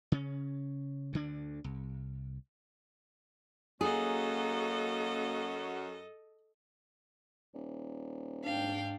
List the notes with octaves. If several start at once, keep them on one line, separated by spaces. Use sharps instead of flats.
C#3 C#4
D2 D3 D4
C2
F#2 A#3 C#4 F#4 G#4 A4 D#5
D#1
G#2 D4 F5 G5